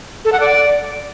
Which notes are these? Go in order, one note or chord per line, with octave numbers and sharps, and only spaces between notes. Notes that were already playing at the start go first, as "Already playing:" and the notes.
A4
F#5
D5